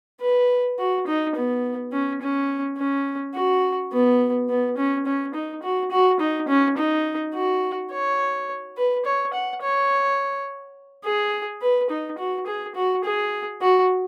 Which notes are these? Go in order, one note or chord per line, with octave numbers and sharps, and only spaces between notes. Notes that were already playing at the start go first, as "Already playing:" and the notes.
B4
F#4
D#4
B3
C#4
C#4
C#4
F#4
B3
B3
C#4
C#4
D#4
F#4
F#4
D#4
C#4
D#4
F#4
C#5
B4
C#5
F#5
C#5
G#4
B4
D#4
F#4
G#4
F#4
G#4
F#4